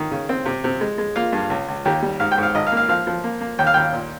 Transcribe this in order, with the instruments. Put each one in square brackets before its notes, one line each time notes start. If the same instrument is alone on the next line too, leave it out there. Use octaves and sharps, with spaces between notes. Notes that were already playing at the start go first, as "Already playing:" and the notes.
Already playing: [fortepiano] D#3
C#3
C4
C3
C3
G#3
G#3
A#3 F4
G2
C#2
C#2
D#2 G4
G3
G#2 F5
G5
G#2 F5
G#1 D#5
F5
A#3
F5
F3 F5
F3
A#3
A#3
D#2 G5
F5
D#2 G5
A#2